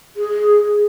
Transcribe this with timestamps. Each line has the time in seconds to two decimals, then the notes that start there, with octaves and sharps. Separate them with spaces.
0.16 G#4